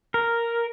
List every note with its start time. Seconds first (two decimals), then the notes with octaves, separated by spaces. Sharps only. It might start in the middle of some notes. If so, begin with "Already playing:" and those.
0.14 A#4